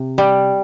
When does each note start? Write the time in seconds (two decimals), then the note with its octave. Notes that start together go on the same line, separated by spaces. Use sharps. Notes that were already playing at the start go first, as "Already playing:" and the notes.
Already playing: C3
0.18 G3